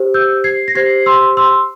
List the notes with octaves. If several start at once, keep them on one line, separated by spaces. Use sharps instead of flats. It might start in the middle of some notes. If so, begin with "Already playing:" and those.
Already playing: G4 C5
E6 G6
G#6 C7
A#6
G4 C5 G#6 C7
C6 E6
C6 E6